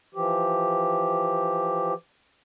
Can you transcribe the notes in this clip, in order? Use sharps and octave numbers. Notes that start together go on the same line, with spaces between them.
E3 F3 G4